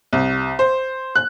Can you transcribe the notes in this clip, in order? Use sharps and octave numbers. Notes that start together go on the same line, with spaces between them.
C2
C5
F#6